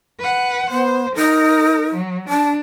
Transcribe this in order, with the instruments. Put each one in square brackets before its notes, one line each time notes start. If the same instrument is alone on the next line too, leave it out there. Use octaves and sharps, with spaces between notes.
[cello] B4 F#5
[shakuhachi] B3 [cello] C5
[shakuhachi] D#4 [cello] A#4
[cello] F#3
[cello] D4 [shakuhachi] A5